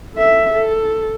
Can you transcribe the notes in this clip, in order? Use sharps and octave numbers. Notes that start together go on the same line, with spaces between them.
A4 E5
A4